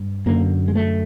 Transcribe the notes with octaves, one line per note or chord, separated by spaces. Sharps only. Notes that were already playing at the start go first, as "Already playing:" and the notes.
Already playing: G2
F#2 D3 A#3
G#3
A3